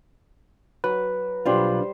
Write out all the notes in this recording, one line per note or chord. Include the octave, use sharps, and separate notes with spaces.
F#3 B4
B1 G3 D4 F4 C5